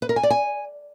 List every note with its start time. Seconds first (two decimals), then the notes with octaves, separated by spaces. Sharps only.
0.02 B4
0.09 A#4
0.16 G#5
0.23 D5
0.30 G#5